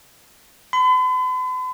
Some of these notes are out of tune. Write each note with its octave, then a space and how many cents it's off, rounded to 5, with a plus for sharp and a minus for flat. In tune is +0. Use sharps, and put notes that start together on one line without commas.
B5 +45